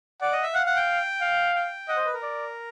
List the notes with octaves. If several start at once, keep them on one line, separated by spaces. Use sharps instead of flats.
D5 F#5
D#5
E5
F5 F#5
F#5
G5
F5
G5
D#5 F#5
C5
B4
A#4
D5